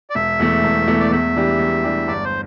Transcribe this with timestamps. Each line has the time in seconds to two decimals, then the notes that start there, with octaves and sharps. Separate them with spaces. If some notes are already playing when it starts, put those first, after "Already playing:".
0.10 D5
0.15 E1 E5
0.39 E2 E3 A3
0.64 E1
0.88 E2 E3 A3
1.00 D5
1.11 E2 E5
1.36 E3 G3 D4 G4
1.59 E2
1.84 E3 G3 D4 G4
2.08 G1 D5
2.24 C5